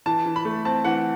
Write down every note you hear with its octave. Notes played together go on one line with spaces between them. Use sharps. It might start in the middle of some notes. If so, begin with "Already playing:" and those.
E3 A5
E3
B5
A3
C4 A5
E3 F#5